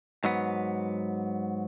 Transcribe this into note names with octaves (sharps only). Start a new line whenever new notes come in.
G#2 F#3 B3